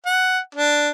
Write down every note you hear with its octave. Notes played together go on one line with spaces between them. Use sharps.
F#5
D4